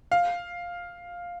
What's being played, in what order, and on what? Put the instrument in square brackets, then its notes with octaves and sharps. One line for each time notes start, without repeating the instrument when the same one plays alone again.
[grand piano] F5